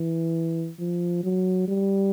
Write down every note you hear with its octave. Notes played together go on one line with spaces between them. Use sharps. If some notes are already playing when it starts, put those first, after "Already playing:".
Already playing: E3
F3
F#3
G3